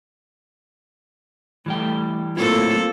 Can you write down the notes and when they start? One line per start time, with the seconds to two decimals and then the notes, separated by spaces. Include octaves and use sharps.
1.66 E3 G3 A3 G5
2.37 F#3 A3 A#3 C4 E4 F4 A4